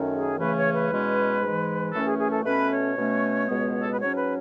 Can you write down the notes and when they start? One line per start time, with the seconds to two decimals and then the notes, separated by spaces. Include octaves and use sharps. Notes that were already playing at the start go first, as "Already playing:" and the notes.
Already playing: F#2 D#3 A3 C#4
0.14 G#4
0.39 C#2 C#3 E3 A3 C#4 B4
0.57 C#5
0.74 B4
0.90 E2 B2 G#3 C#4
1.42 G#2 E3 G#3
1.93 F#2 E3 A3 C#4 A4
2.07 G#4
2.19 G#4
2.32 A4
2.45 B2 A3 C#4 B4
2.71 C#5
2.97 B2 A3 C#4
3.48 C#2 B2 G#3 B3
3.83 A4
3.92 B4
3.99 G#2 F#3 C#4 C#5
4.17 B4